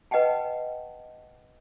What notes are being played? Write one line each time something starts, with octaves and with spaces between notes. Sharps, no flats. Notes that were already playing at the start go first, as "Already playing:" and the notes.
B4 D#5 F#5 G5 A5